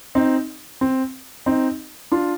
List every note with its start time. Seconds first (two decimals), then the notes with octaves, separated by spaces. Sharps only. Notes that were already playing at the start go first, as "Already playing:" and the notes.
0.15 C4 D#4
0.81 C4
1.46 C4 D#4
2.12 D4 F4